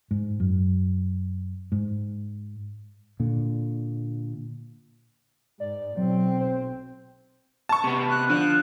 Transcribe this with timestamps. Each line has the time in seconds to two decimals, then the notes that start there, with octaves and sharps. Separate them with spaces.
0.11 G#2
0.40 F#2
1.72 G#2
3.20 A#2 D3
5.60 G#2 D5
5.97 B1 F#3 C4
6.40 C5
7.69 A5 C#6
7.84 C3 B3
8.10 F#6
8.30 D3 F3 F#6